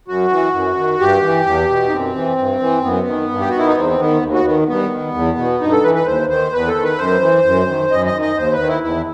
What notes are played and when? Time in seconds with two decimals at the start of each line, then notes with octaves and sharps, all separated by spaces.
0.08 F#2 F#4
0.31 E3
0.54 F#2
0.77 D#3
1.00 G2 G4
1.23 E3
1.46 E2
1.69 B2
1.88 D#4
1.92 F#2 C4
2.15 E3
2.38 G2
2.61 E3
2.84 F#2 B3
3.07 D#3
3.31 G2
3.40 G4
3.49 F#4
3.53 D#3
3.58 E4
3.67 D#4
3.77 E2 C4
3.99 D#3 B3
4.22 D#2
4.34 F#4
4.45 D#3 B3
4.68 G2 B3
4.91 D#3
5.14 E2
5.38 B2
5.61 G2 D#4
5.72 A4
5.84 E3 B4
5.95 B4
6.06 D#2 C5
6.30 D#3 C5
6.53 E2 B4
6.67 A4
6.76 D#3
6.84 B4
6.98 F#2 C5
7.22 E3
7.45 F#2
7.68 D#3
7.91 F#2 D#5
8.06 D#5
8.13 D#3
8.22 D#5
8.37 D#2 C5
8.52 B4
8.60 D#3
8.68 E4
8.83 E2 E4